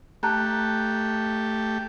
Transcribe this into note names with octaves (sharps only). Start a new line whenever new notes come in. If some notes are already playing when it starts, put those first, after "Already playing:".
A3 G4 A5 A#5 F#6